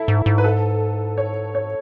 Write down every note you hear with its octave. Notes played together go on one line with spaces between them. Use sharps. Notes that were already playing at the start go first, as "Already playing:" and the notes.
Already playing: E4 A4
G#2
G#2
B4
A4
C#5
C#5